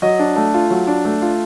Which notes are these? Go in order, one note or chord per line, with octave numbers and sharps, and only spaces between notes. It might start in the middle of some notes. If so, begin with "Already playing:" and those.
F#3 D#5
D4
A3
F4
F#3
D4
A3
F4